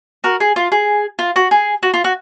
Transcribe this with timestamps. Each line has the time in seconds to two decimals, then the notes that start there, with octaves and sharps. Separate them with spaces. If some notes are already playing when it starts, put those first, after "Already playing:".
0.24 F#4 A#4
0.40 G#4
0.56 F4
0.72 G#4
1.19 F4
1.36 F#4
1.51 G#4
1.83 F#4
1.94 F4
2.04 F#4